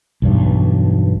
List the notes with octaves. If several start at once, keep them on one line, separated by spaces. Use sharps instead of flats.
B1 E2 G2